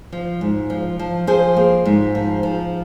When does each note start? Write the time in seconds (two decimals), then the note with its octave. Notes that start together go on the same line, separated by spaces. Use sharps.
0.12 F3
0.41 G#2
0.70 F3
0.99 F3
1.27 F3 G#4 C5
1.57 A#3
1.86 G#2
2.15 F3
2.43 F3